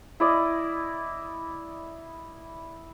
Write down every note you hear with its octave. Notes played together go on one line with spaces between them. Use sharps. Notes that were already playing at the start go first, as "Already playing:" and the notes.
E4 D5 D#5